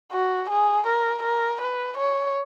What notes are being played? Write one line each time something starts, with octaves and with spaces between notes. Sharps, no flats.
F#4
G#4
A#4
A#4
B4
C#5